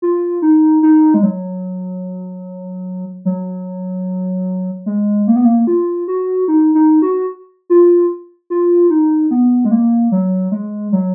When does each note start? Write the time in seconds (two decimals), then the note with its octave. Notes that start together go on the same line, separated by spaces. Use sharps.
0.02 F4
0.42 D#4
0.83 D#4
1.14 G#3
1.23 F#3
3.25 F#3
4.86 G#3
5.27 A#3
5.36 B3
5.45 A#3
5.67 F4
6.08 F#4
6.48 D#4
6.75 D#4
7.02 F#4
7.70 F4
8.50 F4
8.90 D#4
9.31 B3
9.64 G#3
9.71 A#3
10.12 F#3
10.52 G#3
10.92 F#3